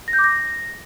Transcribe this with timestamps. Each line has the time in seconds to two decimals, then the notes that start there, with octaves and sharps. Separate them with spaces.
0.08 A#6
0.13 G6
0.19 D6
0.24 A#6